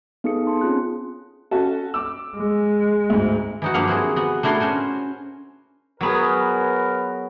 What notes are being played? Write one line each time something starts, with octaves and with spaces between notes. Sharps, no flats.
B3 D#4 G#4 A4 D#6 C#7
A5 C6
C4 C#4 F4 G#4 F#6
C#4 F#4 A4
D6 E6
G#3
D2 G#2
E3 D#4 F#4
G2 F3 F#3 A#3 F5 F#5
C4 E4 F#4 G#4
B3 F#4
A3 D4 E4 F#4 A#4 C6
C#4 F#4 C5 G#5
F#3 B3 G#4 A#4 B4